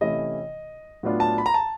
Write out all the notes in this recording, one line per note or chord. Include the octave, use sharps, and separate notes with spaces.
C3 E3 A3 C#4 E4 D#5
A2 F#3 B3 D4 F4
A5
B5
A#5
A5